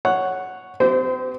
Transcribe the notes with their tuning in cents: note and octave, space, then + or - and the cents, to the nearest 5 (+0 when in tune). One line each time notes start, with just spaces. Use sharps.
C#5 +0 F#5 +0
C4 -40 G4 -35 C5 -15